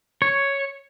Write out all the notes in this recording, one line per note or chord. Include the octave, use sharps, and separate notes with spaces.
C#5